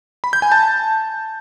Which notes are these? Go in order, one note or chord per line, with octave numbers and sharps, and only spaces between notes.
B5
G6
G#5
A5